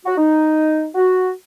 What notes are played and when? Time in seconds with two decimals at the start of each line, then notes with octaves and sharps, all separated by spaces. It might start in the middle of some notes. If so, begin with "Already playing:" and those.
0.05 F#4
0.17 D#4
0.95 F#4